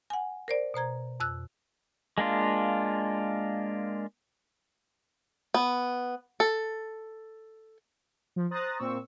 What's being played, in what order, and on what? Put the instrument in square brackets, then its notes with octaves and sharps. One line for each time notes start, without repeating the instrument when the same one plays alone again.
[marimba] F#5 G#5
A#4 C5 D5
B2 C5 A#5 G#6
F2 E6 F#6
[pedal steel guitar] G#3 A#3 D4 F4
[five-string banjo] B3
A4
[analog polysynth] F3
C5 A#5 D#6 F#6 A6 A#6
A#2 C4 C#6 E6